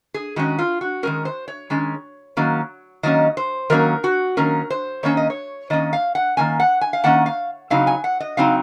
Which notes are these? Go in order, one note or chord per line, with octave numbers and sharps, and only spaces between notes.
G#4
D#3 G#3 C#4 F#4
F4
F#4
D#3 G#3 C#4 A#4
C5
C#5
D#3 G#3 C#4
D#3 F#3 A#3 C#4
D#3 F#3 A#3 C#4 D#5
C5
D#3 F#3 A#3 C#4 A#4
F#4
D#3 F#3 A#3 C#4 A#4
C5
D#3 A#3 C#4 C#5
D#5
C#5
D#3 A#3 C#4 D#5
F5
F#5
D#3 A#3 C#4 G#5
F#5
G#5
F5
D#3 A#3 C#4 F#5
F5
C#3 F#3 C4 D#4 F5
G#5
F#5
D#5
C#3 F#3 C4 D#4 F5